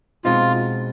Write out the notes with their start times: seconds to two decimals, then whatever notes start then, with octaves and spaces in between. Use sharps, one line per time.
0.24 B2 G#3 C4 D#4 F4